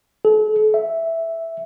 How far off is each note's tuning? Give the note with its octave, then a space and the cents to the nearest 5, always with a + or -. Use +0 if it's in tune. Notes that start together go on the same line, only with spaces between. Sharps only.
A4 -40
E5 +0